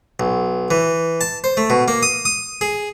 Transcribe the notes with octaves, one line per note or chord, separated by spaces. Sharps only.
B1
E3
A5
C5
A3
B2
A#3
D#6
D#6
G#4